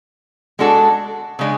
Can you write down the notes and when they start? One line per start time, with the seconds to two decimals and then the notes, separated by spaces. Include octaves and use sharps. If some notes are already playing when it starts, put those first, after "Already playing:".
0.59 G#3 D4 F#4 A4
1.39 C#3 G#3 D4